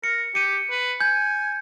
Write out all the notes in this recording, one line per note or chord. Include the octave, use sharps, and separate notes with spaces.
A#4 C#7
G4 C#7 D#7
B4
G#5 G6